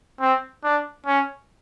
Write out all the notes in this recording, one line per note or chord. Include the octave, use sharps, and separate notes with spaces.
C4
D4
C#4